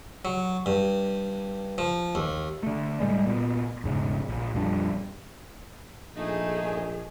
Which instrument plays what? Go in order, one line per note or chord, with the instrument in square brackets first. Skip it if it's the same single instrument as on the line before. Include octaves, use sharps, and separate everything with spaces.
[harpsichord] F#3
G2
F3
D#2
[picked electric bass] D3 A3
A2 G3 G#3
A#2 B3
E1 G#2 C#3
A#1
A#1 F2 G3 D4
[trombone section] A#1 [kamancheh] A3 G#4 [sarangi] D#4